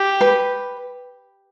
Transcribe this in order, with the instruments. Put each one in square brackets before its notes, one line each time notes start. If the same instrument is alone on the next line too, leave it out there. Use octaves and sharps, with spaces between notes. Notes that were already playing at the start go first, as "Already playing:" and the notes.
Already playing: [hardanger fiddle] G4
[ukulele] B4